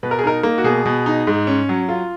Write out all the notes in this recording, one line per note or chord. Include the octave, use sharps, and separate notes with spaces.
B2 B4
A#4
G#4
D#4 A#4
A#3
F#4
B2 G#4
B2
D#4
G#2
C#4
F#3
F4